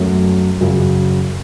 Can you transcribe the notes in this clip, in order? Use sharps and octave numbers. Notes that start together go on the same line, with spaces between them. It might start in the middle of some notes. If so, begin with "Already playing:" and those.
Already playing: F#2 F#3 A3
F#2 C#3 F#3